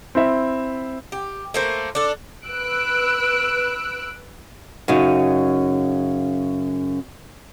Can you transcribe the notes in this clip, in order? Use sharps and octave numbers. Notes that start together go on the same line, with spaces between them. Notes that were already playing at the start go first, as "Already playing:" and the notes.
C4 E4 E5
G4
A3 A#3 C5
D4 A4
B4 E6 F#6 D7
F#2 C#3 D#4